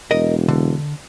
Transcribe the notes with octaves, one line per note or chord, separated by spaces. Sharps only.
E1 A#4 D#5
D3